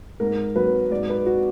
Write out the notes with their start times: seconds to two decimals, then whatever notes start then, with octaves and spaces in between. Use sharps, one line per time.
0.20 G#2 A#4
0.56 F#3 B4
0.91 G#2 D5
1.09 B4
1.26 F#4